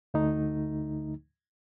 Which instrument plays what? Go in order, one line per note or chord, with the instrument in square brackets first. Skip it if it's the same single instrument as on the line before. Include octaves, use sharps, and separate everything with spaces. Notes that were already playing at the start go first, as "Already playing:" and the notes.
[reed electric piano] D2 D3 A3 D#4